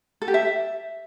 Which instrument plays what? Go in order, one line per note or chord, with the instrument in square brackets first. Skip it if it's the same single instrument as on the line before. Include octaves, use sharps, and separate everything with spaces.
[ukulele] A4
G4
E5